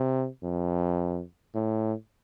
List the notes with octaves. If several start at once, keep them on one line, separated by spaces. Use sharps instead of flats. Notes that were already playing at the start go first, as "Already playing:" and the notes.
Already playing: C3
F2
A2